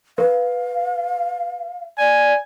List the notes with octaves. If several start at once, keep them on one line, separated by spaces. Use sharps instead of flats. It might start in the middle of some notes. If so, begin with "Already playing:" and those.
A#4 B4 F5
D5 G#5